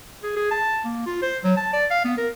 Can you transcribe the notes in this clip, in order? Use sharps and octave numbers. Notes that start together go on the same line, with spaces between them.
G#4
G#4
A5
A#3
F4
C5
F#3
A5
D5
F5
B3
A#4